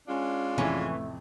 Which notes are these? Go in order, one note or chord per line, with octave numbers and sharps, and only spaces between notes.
G#3 C#4 D4 F4
A1 F2 C3 E3 A3 C#4